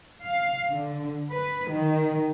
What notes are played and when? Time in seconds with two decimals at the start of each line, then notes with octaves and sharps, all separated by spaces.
0.23 F5
0.71 D3
1.30 B4
1.67 D#3